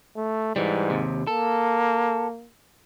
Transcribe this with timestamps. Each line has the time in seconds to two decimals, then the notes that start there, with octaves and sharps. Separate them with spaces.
0.16 A3
0.56 G#2 E3 G3
0.90 D#2 C3
1.27 A#3 A4